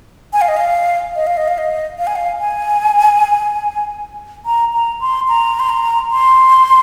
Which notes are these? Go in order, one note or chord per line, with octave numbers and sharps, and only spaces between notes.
G#5
F5
D#5
F5
D#5
F5
D#5
F5
D#5
F5
G#5
F5
G#5
A#5
A#5
C6
A#5
C6
A#5
C6